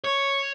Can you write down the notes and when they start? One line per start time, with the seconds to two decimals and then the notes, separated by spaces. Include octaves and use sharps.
0.04 C#5